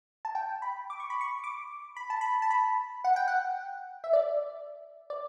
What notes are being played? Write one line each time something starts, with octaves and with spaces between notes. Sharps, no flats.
A5
G5
B5
D6
C#6
B5
C#6
D6
B5
A5
B5
A5
B5
F#5
G5
F#5
E5
D5
D5